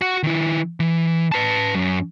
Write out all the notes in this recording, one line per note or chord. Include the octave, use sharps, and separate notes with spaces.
F#4 F#5
D#3 E4
E3
B4 A5
F#2